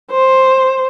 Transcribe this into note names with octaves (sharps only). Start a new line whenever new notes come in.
C5